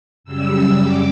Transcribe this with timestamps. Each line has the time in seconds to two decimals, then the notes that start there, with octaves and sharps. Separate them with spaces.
0.24 F#2 C#3 G3 E6
0.79 D6